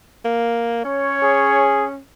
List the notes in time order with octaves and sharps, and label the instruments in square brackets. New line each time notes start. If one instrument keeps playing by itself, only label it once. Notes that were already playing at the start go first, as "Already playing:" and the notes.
[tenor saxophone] A#3
[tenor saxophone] C#4 [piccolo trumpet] C#5
[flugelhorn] G#4